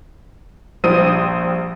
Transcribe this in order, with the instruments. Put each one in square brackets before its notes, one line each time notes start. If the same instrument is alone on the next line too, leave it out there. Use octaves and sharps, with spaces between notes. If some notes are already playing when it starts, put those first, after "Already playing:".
[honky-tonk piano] A#1 G3 C5 D#6 D#7